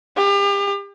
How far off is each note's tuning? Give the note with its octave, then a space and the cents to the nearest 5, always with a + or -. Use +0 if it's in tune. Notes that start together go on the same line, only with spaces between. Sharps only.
G4 +35